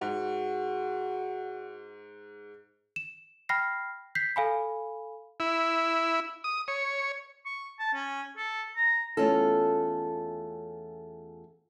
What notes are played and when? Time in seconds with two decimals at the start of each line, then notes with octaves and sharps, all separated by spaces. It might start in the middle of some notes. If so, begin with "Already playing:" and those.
0.01 G#2 F#4
2.96 E7
3.49 G5 B5 F6 A#6 C7
4.15 G6 B6 C7
4.36 A4 F5 G#5 B5
5.40 E4
6.44 D#6
6.68 C#5
7.46 C#6
7.79 A5
7.94 C#4
8.37 A4
8.77 A#5
9.17 E2 A#2 A3 C#4 F4 A4